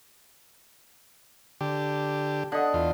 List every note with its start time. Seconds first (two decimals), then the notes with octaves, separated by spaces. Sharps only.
1.61 D3 G4
2.52 D3 D#5 F#5
2.74 E2 F4